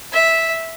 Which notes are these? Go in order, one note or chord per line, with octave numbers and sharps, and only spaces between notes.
E5